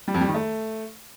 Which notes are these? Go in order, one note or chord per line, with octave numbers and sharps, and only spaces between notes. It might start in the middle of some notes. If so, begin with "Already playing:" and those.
G3
F2
G3
D#3
A3